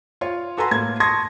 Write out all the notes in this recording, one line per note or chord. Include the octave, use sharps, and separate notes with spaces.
F4 C#5
F#4 A4 B4 G#5 A#5 C6
A2 A#3 G#6
A5 C6 C#6 D#6 G#6 A#6